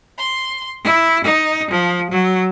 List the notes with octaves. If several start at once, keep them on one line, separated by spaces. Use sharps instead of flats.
C6
E4
D#4
F3
F#3